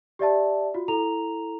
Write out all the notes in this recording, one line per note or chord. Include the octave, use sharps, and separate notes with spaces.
G4 D5 E5 A5
F4 F#4
E4 A4 A#5 F7